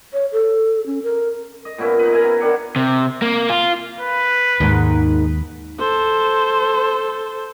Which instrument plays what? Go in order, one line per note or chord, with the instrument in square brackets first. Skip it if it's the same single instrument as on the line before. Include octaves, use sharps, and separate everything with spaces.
[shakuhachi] C#5
A4
C#4
A#4
[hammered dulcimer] D#5
A#2 B3 C#4 E4
D#4 B4
E4 A#4 G#5 A#5
B3
D#3 D4 F#5
[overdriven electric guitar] C3
A#3
F4
[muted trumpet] B4
[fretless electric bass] D#2 [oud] G#2 D#3
[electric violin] A4 C5